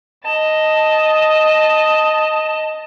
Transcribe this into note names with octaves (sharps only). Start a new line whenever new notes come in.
D#5 A5